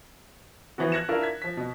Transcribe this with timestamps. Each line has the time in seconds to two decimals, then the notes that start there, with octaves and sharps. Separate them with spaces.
0.78 E3 F3 B3 F#4
0.92 F#6 G#6 A#6 C#7 E7
1.09 D4 E4 F4 A#4
1.22 G#6 B6
1.42 F3 B6
1.57 B2